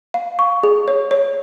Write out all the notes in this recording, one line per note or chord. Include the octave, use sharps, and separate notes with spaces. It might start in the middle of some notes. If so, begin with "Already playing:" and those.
F5
C#6
G#4
C#5
C#5